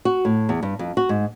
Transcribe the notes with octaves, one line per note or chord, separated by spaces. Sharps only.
F#4
A2
E2
G2
F2
F#4
G#2